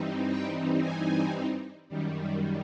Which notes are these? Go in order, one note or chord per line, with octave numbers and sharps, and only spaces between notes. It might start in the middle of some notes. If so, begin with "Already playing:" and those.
Already playing: G2 E3 G3 C4 D#4
G5
G#5
F#2 D#3 G3